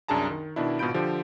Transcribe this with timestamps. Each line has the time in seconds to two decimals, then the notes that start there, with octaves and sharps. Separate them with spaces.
0.08 C2 F#2 D4 G#4 A5 A#5
0.30 D#3
0.56 B2 D#3 D4 E4
0.79 G#1 B2 F4 B5 G6 D7
0.94 D3 F3 G4 C5